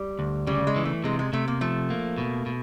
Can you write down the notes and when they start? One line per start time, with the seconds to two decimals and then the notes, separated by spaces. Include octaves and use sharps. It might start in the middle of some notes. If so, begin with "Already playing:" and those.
Already playing: G3
0.19 D2
0.47 C#3 G3
0.67 G#3
0.76 E3
0.85 A3
1.04 C3 G#3
1.19 G#3
1.33 C3 A3
1.48 A#3
1.61 F3 A3
1.90 A#3
2.18 B2
2.46 B2